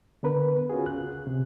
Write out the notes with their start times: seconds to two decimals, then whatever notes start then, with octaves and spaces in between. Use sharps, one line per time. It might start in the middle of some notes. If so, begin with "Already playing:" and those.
0.23 D3 B3 A#4 B4
0.70 C#4 F4 F#4 G#4
0.86 C#2 F#6
1.27 C3